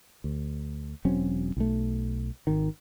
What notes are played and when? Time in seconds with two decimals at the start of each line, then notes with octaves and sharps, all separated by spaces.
0.24 D2
1.05 E1 F#3 C4 C#4
1.57 B1 A3
2.47 G#1 D#3